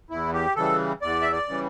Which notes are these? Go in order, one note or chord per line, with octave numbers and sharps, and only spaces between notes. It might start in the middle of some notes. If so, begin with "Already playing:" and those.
E2 E4
G4
C#3 E3 G3 A4
E2 D5
E5
D5
C#3 E3 G3